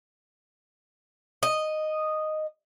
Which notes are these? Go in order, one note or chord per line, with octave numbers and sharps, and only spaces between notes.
D#5